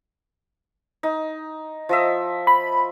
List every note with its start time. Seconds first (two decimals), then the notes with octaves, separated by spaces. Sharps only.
1.03 D#4
1.89 F3 D#5 E5
2.47 B5